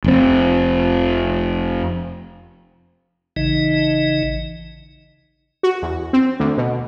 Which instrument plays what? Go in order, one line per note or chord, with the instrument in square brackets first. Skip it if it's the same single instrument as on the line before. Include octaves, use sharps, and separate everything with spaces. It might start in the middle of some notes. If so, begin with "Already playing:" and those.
[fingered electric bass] F1 C4
[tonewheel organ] A1 C#3 E3 D#4 D#5
[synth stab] F#4
E2
C4
D2
B2